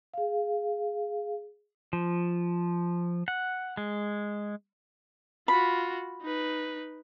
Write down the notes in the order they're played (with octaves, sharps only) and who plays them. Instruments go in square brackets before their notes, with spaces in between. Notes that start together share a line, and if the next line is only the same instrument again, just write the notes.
[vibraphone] G#4 F5
[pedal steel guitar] F3
F#5
G#3
[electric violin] F4 F#4 [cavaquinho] B5
[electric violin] D#4 B4